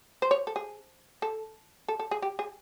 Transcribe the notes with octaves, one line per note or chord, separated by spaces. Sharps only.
C5
C#5
A4
G#4
A4
A4
A4
G#4
G4
G#4